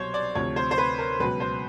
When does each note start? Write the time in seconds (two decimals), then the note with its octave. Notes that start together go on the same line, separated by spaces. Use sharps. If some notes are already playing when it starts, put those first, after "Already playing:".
Already playing: C2 B2 F#3 C5 C#5
0.14 D5
0.35 D2 C3 F3 C#5
0.56 C5
0.71 C5
0.78 B4
0.98 A#4
1.19 C#2 B2 F#3 B4
1.40 C5